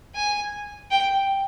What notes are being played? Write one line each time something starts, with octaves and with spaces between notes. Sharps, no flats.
G#5
G5